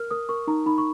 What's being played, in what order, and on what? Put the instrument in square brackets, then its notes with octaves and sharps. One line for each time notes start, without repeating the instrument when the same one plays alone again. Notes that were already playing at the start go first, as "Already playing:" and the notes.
Already playing: [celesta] A#4 F6
A#4 D#6
A#4 C#6
D#4 A#5
D#4 B5
C#6